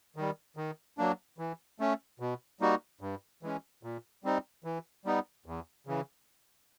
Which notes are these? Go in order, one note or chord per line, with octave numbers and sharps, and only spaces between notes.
D#3 G3
D#3
F#3 A#3 D4
E3
A3 C#4
B2
G3 A#3 D#4 F#4
G2
E3 G#3 C#4
A#2
G3 C4 D#4
E3
G3 B3 D#4
E2
C#3 E3